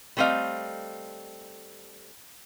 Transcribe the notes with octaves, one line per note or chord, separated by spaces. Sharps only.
G3 A3 C4 D#5 F5